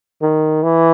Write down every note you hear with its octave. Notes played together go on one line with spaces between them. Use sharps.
D#3
E3